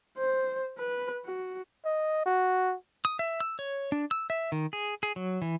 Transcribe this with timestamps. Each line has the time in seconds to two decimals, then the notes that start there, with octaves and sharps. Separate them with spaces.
0.19 C5
0.78 B4
1.25 F#4
1.85 D#5
2.26 F#4
3.05 D#6
3.19 E5
3.40 E6
3.59 C#5
3.92 D4
4.11 E6
4.30 E5
4.52 D#3
4.73 G#4
5.03 G#4
5.16 F#3
5.42 E3